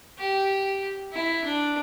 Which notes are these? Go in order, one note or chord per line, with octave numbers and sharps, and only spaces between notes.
G4
E4
D4